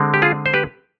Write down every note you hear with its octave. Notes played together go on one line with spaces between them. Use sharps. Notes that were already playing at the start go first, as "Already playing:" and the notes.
Already playing: D3 G#3 C4
G4
F4 G#4
C5
G4 B4